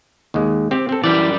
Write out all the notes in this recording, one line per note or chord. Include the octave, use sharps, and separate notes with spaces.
D#2 G#3
C4 G4
C4 A4
F#2 E3 G3 D5